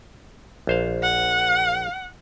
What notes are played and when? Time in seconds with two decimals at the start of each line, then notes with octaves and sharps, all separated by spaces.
0.67 A#1 C5 F5
1.03 F#5